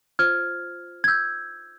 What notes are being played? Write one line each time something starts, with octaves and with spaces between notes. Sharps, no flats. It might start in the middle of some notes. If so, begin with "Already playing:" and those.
F4 C5 F6 G#6
G#6
E6 G6